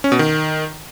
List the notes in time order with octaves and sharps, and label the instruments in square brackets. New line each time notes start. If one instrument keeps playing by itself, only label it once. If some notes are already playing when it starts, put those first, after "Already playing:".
[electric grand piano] C#4
B2
D#3